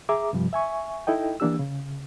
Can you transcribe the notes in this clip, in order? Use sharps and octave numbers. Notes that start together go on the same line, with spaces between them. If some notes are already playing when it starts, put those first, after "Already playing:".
G#4 E5 A#5 D6
G2 C3 F3 G3
E5 G#5 C#6
D#4 E4 A4 D#5 G5
E3 A#3 D4 G4 E6
C#3